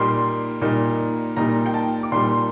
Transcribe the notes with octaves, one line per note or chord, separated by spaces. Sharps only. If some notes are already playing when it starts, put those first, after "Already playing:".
Already playing: A#2 G3 A#3 D#4 C6
A#2 G3 A#3 D#4
A#2 G3 A#3 D#4 A#5
G5
A5
D6
A#2 G3 A#3 D#4 C6